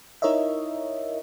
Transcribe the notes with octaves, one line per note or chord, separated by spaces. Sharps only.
D#4 E4 A#4 C#5 D#5 E5